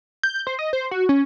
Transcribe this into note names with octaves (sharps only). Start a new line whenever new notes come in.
G6
C5
D#5
C5
F#4
C#4